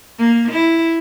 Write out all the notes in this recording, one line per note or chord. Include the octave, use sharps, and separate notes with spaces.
A#3
E4